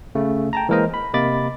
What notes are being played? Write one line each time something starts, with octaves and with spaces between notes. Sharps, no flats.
C#3 A3
G5 A5 A#5
E3 G#3 A#3 A#4 C5 D#5
B5
C3 A#3 D#5 B5 D6 A6